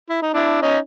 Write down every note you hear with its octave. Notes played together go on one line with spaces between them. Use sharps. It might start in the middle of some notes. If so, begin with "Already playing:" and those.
E4
D#4
D4 E4
C#4 D#4